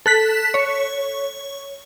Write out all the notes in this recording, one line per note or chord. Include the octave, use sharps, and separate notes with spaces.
A4 F#6 B6
C#5